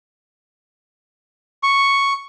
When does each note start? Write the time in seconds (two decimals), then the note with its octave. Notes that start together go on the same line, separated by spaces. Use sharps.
1.63 C#6